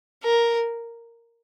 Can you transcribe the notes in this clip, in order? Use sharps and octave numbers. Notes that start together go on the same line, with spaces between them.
A#4